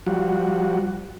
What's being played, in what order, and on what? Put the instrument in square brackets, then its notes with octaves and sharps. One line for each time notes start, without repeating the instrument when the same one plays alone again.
[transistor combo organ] F3 G3 F#4